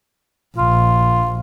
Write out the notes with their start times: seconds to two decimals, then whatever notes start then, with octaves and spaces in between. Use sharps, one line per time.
0.58 A#1 F4